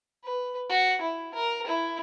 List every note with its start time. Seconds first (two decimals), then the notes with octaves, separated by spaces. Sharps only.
0.24 B4
0.69 F#4
1.01 E4
1.34 A#4
1.67 E4